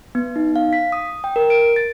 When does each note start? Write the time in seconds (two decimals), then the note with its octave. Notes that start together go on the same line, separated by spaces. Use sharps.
0.15 B3
0.36 D#4
0.56 F5
0.73 B6
0.92 D#6
1.24 G5
1.36 A#4
1.50 D7
1.76 A6